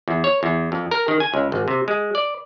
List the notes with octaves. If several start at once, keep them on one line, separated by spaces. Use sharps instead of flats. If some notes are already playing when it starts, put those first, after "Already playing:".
E2
C#5
E2
F2
A#4
D#3
G#5
C#2
G#1
C3
G#3
D5